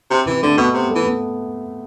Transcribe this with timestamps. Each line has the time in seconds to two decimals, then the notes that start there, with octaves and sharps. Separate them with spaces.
0.10 C3
0.26 C3 E3
0.42 D3 A3
0.58 B2 B3
0.74 C3
0.90 E3 A3
1.06 B3